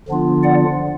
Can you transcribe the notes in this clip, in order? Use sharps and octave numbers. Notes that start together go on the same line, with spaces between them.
D3 F3 B3 D4 F4
D5 F#5